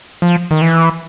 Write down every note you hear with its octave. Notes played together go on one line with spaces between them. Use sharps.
F3
D#3
E3